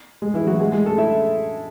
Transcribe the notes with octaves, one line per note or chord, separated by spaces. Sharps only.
G#3 G#4
E3 E4
F#3 F#4
G#3 G#4
G#3 G#4
A3 A4
E4 E5